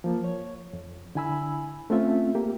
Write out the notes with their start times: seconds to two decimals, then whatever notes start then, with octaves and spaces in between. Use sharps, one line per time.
0.04 F3 A#3
0.24 C#5
0.73 F2
1.15 D3 E4 G#5 B5 E6
1.90 A3 C4 C#4 F4 E5
2.35 A#3 G4